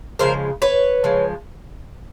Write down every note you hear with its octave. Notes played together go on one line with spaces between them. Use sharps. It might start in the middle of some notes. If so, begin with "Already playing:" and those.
C#3 F3 G#3 A#4 C5
B4 C#5
C#3 F3 G#3